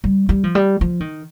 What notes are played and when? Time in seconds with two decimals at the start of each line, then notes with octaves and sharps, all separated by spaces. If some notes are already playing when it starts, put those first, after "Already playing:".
0.04 G3
0.29 G3
0.44 F3
0.55 G3
0.81 F3
1.00 D#3